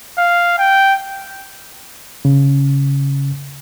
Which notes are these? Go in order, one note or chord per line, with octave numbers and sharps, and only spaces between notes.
F5
G5
C#3